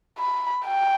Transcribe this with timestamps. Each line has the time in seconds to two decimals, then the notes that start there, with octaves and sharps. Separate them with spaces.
0.18 B5
0.66 G5